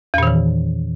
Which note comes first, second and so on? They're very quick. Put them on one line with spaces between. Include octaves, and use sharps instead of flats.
E2 A#2 D#3 E3